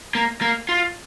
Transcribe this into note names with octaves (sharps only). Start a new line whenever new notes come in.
A#3
A#3
F4